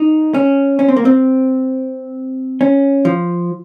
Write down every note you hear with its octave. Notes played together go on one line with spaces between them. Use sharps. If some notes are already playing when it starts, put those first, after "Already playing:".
Already playing: D#4
C#4
C#4
C4
A#3
C4
C#4
F3